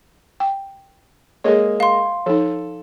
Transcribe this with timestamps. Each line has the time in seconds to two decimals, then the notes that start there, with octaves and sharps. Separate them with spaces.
0.40 G5
1.44 G#3 A#3 G#4 A4 C#5 D#5
1.80 F5 C6
2.26 F3 D#4 A4